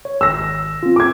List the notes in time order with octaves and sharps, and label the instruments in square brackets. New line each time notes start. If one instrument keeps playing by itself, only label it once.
[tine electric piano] C#5
[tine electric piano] G#1 [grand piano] E6 A#6
[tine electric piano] C4 F4
[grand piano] D6 G#6